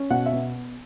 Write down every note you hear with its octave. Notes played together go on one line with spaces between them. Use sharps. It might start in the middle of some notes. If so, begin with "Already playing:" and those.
Already playing: C#4
B2 F#5
E5
B3